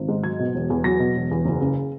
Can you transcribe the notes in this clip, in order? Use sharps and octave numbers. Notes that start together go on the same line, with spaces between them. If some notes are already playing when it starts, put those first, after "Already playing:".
Already playing: G#1
G#2
F#3 G#6
B2
E1
E2
F#3 A#6
B2
E1
E2
F#1
C#3